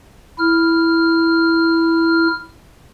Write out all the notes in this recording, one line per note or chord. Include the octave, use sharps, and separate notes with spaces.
E4 F6